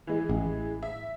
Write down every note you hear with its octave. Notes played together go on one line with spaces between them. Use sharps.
E3 G#3
A1
E5